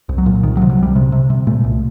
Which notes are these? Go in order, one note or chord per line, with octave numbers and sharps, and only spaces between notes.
C2
F#3
A#2
C2 D#3
F#3
C3
F#3
C2 G3
C3
C3
C3
A#2 A3
C2